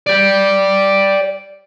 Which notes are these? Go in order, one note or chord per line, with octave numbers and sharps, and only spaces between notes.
D5 G5